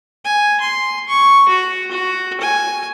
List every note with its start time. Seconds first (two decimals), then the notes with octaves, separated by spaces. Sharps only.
0.25 G#5
0.61 C6
1.08 C#6
1.49 F#4
1.91 F#4
2.41 G#5